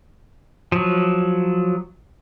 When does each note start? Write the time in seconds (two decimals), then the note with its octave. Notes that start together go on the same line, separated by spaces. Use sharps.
0.72 F3 F#3